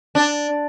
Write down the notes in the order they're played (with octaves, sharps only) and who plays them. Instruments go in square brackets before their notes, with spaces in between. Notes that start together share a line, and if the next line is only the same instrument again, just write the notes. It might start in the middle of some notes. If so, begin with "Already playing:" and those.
[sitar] D4